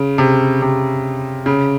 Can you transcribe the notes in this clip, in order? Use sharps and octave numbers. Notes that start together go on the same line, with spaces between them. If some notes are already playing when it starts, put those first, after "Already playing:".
Already playing: C#3
C3
C3
C#3